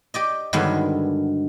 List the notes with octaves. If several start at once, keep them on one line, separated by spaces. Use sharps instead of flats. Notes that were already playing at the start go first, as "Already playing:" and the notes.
G4 D5 D#5
G2 D3 D#3 F#3 G#3 B3